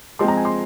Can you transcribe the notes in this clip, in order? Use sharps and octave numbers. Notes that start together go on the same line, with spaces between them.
F3 G#3 C4 C6
A#5
G#5
C6